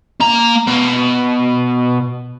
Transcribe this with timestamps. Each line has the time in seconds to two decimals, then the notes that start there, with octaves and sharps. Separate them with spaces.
0.20 A#3 A#5
0.67 B2